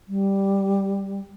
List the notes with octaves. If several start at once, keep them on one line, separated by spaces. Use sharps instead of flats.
G3